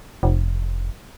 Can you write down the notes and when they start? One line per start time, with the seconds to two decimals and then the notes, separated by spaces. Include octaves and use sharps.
0.23 F1